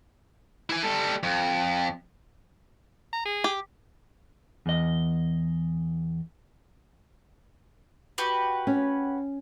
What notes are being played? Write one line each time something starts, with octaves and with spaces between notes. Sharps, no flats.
E4 G#5
G3 A4
F2
A#5
G#4
G4
E2 D#5
F#4 G4 B4
C#4